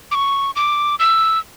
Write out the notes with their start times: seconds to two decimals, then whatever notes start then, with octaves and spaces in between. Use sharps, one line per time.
0.11 D6
0.15 C#6
0.56 D6
0.99 E6